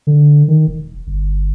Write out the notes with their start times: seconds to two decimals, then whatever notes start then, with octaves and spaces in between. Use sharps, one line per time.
0.07 D3
0.48 D#3
0.67 E1
1.07 G1